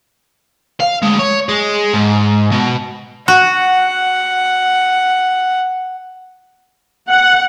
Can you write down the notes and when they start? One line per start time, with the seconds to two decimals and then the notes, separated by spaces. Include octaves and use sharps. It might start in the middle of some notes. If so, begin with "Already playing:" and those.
0.80 F5
1.02 D2 G#3
1.19 C#5
1.49 G#3
1.93 G#2
2.51 B2
3.28 F#4 F#5
7.08 F#5